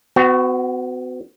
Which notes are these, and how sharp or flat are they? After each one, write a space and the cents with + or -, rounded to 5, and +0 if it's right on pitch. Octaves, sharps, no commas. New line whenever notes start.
B3 +45 F#4 +0